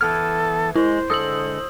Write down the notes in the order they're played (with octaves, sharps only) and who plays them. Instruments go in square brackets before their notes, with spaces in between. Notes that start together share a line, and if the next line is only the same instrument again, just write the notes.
[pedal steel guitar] E3 B3 F6 [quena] A4 [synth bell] G#6
[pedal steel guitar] G#3 [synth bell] E4 [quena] C5
[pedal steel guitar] D3 G#3 A4 [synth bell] D#6 E6 F#7